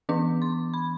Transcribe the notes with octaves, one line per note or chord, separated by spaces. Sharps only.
E3 B3 D4 D6
C6
B5